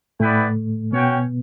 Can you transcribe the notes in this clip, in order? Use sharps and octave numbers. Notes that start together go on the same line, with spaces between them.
A2 A3 B3 E4 B4 D5 G5
B2 B3 C#4 F#4 C#5 G5